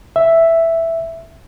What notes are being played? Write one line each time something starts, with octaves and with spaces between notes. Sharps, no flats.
E5